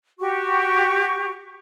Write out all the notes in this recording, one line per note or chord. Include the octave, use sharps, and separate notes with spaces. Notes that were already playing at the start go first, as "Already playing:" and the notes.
F#4 G4 C#6